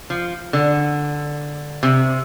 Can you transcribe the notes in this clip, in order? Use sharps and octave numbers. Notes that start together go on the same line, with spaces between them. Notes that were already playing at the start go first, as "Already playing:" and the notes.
F3
D3
C3